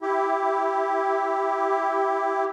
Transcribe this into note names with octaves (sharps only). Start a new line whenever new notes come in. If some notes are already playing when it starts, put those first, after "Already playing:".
E4 G4